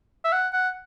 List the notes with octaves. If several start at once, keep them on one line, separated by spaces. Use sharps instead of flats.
E5
F#5
F#5